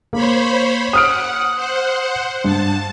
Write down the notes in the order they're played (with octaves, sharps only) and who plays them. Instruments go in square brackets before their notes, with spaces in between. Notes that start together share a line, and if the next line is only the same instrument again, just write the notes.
[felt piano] A#3 [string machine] C5 C#5 B5
[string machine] F#5 [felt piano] D#6 F6 D7
[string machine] C5 F#5
[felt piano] G2 [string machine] A5